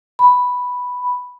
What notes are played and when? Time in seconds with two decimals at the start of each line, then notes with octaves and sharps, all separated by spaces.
0.19 B5